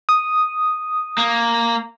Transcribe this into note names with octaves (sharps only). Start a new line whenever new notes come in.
D#6
A#3